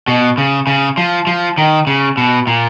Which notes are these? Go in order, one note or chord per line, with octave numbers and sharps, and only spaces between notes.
B2
C#3
C#3
F3
F3
D#3
C#3
B2
A#2